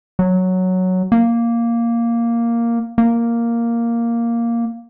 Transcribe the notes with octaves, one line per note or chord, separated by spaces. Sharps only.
F#3
A#3
A#3